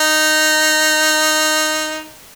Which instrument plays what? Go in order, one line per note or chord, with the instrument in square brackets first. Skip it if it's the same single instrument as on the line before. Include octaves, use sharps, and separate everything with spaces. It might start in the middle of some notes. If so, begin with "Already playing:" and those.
Already playing: [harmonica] D#4